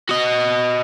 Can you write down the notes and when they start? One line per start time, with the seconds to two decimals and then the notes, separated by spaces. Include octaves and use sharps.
0.09 F#4 D#5